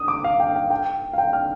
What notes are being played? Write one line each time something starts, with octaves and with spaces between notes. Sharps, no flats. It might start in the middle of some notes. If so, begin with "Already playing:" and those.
Already playing: D#6
D6
F5
G5
F5
G5
F5
G5
F6